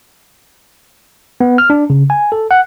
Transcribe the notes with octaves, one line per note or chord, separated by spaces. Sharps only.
B3
F6
D4
C#3
G#5
A4
F#5